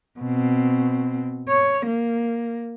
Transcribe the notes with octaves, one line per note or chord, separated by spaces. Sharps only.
B2 C4
C#5
A#3